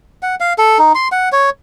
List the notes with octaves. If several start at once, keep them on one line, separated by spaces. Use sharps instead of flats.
F#5
F5
A4
D#4
C6
F#5
C#5